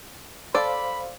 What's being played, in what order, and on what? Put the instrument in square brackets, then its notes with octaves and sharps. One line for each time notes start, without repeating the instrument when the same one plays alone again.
[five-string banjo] A4 D5 [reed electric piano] C5 F5 [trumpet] B5